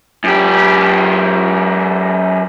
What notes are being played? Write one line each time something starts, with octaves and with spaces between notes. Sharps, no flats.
F#2 G4